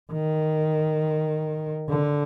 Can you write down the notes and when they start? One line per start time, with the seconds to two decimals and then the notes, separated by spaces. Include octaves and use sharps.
0.13 D#3
1.88 D3